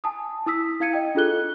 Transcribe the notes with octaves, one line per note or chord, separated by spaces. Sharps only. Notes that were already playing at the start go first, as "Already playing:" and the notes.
G#5 A5 D#6
E4 D#6 E6 B6
E4 F5 G#6 C#7 D#7
D#5 G5
D4 F4 G#4 A4 F#6 G7